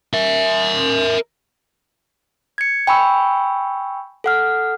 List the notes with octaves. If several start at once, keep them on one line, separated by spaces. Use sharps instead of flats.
A#4 E5
G#6 C#7
G5 G#5 B5 C#6 E6
A4 F#5 F6